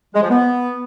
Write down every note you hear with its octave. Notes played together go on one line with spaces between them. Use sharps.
G#3
F3
B3